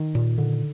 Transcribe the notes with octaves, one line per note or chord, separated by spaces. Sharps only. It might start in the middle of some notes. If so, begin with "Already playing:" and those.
Already playing: D#3
A#2
D3